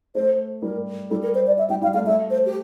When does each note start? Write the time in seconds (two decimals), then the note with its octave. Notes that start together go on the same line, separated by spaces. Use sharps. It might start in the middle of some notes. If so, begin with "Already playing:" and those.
0.15 A3 C5
0.62 G3 A#4
1.10 G3 A4
1.23 A#4
1.35 C5
1.47 D5
1.58 E5
1.70 G3 G5
1.82 G3 F5
1.94 A3 F5
2.06 A3 E5
2.30 C5
2.46 G4